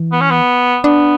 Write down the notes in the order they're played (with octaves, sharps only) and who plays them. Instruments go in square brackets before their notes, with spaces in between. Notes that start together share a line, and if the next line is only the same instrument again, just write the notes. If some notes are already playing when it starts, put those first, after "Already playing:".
Already playing: [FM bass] E3
[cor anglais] B3
C#4
B3
[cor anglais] B3 [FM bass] D4